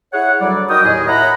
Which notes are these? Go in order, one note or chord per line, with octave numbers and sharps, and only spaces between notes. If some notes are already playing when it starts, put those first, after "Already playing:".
E4 G#4 C#5 F#5
D2 F#3 G3 D5
D#4 F#4 A#4 G5 D#6
D#2 A2 E4 G#4 D#5 G#5
C#5 D#5 E5 F#5 A#5 B5